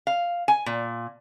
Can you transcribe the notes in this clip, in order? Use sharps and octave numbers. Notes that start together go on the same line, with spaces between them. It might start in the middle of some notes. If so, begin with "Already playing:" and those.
F5
G#5
A#2